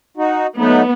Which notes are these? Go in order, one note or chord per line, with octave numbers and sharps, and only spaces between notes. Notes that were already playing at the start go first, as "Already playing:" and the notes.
D#4 F#4
F#3 A3 B3 D#4